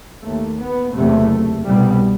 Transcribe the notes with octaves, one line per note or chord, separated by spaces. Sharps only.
D#2 A3
B3
F#1 E2 C3 A3
C2 B2 G3